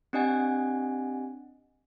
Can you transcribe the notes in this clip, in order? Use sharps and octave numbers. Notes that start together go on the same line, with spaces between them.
C4 D4 G4 D#5 F#5 G#5